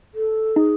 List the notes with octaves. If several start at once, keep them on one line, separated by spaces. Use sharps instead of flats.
A4
D#4 G#4